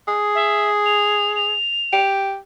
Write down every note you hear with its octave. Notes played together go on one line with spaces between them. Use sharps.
G#4
E5
F7
F7
G4